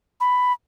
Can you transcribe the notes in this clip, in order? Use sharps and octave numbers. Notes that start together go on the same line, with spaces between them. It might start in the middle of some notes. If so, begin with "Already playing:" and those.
B5